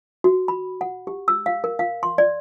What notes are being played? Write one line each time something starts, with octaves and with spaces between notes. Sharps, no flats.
F#4
B5
F#5
G4
E6
F5
A#4
F5
C6
D5